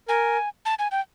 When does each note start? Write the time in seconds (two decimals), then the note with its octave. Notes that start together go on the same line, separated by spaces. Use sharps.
0.08 A#4 G#5
0.66 A5
0.79 G#5
0.91 G5